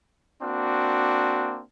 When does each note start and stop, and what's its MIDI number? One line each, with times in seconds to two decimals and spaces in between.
0.43 1.62 58
0.43 1.62 60
0.43 1.62 62
0.43 1.62 66